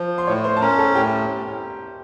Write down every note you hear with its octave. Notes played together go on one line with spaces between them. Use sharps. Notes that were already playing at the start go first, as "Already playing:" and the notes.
Already playing: F3
C6
A2 C#5 C#6
C5 C6
A5
C#4 A#4 A#5
A4 A5
A2 G4 G5